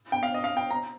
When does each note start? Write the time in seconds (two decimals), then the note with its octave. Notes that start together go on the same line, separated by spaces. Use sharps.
0.12 G5
0.23 F5
0.34 D#5
0.44 F5
0.57 G5
0.71 A#5